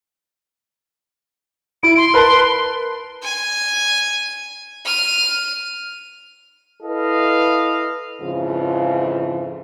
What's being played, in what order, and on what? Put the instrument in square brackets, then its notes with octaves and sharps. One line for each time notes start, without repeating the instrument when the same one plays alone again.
[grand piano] E4 [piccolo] D7
[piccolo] C6
[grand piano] A#4 B4 A5
[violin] G#5
F6 D#7
[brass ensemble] E4 A4 B4 D#5 F5
[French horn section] F2 G#2 C#3 E3 F3 F4